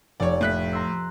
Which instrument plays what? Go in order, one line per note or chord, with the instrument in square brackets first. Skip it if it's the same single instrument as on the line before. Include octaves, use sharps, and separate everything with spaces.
[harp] F1 [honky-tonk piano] C#5 D5
[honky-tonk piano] A2 F#6 B6
[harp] A#5 C6 E6